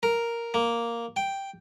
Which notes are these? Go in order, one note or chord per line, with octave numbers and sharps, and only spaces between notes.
A#4
A#3
G5